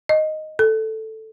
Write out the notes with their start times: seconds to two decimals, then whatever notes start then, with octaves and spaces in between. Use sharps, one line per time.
0.09 D#5
0.59 A4